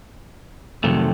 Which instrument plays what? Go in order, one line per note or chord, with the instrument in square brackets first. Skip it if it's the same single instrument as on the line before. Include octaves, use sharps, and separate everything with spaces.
[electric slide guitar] F2 C3 D#3 F#3 A3